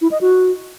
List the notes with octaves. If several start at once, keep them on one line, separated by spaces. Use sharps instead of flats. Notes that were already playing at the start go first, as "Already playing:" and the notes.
E4
D#5
F#4